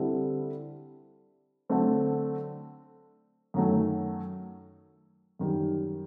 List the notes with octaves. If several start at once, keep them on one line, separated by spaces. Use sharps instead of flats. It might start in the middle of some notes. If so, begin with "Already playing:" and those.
Already playing: D3 G3 C4 E4
D3 F#3 A3 C4
F#2 D#3 F#3 A3
F#2 D#3 G3